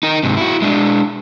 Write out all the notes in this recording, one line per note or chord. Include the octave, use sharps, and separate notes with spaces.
D#4 A#4
G#2 C3
E4 F#4
G#3 D4